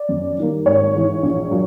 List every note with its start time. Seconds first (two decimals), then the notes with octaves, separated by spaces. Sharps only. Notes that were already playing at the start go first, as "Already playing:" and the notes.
Already playing: D5
0.09 F#2
0.38 D#3 G3 A#3
0.66 G#1 C#5
0.94 G#2 E3
1.23 A#1
1.51 A#2 F#3